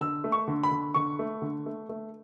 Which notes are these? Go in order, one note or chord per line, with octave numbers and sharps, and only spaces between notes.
D3 E6
A3
C#6
D3
B5
D3
D3 C#6
A3
D3
A3
A3